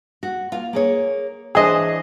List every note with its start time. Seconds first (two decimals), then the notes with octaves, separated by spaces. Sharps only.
0.23 F#4
0.52 A#3 F4
0.73 A#3 G#4 C#5
1.55 E3 D4 G#4 C5 D#5